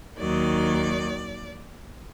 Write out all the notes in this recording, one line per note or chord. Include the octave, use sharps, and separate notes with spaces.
D#2 D#3 F#3 D5